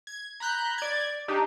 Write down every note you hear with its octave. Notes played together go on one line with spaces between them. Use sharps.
G#6
A#5 B5 F#6 G6
D5 G#6
D4 D#4 G4